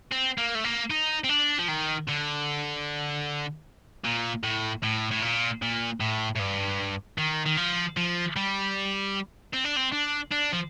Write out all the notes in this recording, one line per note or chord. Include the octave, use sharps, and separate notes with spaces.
C4
A#3
A3
A#3
D#4
C4
D4
F3
D#3
D3
A#2
A2
A2
A2
A#2
A#2
A2
A2
G2
D#3
D#3
F3
F3
G3
C4
D4
C4
D4
D4
F3